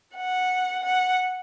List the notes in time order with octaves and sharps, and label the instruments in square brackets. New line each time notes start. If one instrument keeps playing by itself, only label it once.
[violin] F#5
F#5